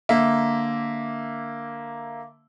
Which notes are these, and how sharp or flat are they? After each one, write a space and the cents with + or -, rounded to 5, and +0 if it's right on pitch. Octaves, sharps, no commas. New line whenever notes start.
D3 +0 A#3 +0 E5 +0